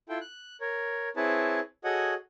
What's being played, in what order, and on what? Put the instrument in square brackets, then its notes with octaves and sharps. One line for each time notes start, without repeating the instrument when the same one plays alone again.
[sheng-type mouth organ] E4 F4 A4 G5
F#6
A#4 C#5
C4 E4 G#4 B4 C#5 A5
F#4 G#4 A4 C#5 D#5 F#5